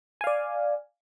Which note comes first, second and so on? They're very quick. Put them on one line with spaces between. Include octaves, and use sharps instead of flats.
G#5 F5 D5